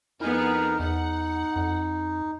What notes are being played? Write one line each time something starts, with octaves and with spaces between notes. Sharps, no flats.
F2 B3 D#4 E4 G#4 A#4
E2 D#4 F#5
F2